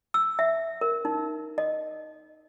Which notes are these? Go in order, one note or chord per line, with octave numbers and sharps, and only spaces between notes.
E6
E5
A#4
D#4
D#5